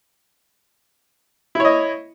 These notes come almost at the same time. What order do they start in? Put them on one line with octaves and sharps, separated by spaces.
E4 C#5 D#5